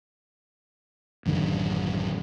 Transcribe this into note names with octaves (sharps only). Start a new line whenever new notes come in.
A1 F#2 D3 D#3